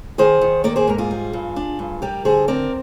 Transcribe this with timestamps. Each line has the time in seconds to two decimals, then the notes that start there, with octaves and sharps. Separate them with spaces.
0.18 D#3 G#4 C5
0.41 D#3
0.64 A#3 A#4 D5
0.76 G#4 C5
0.87 G#2 A#4
0.98 F4 G#4
1.11 G3
1.33 G2
1.56 D4
1.79 G2
2.02 G3 G4 A#4
2.25 D3 G#4 C5
2.48 C4 A#4 D5